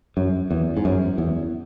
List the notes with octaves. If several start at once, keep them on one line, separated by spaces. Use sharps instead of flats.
F#2
E2
G#2
F#2
E2